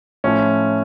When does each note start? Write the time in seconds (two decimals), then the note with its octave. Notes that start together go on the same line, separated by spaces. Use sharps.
0.24 A2 F3 A3 C#4